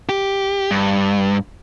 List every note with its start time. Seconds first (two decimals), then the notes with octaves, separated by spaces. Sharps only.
0.09 G4
0.71 G2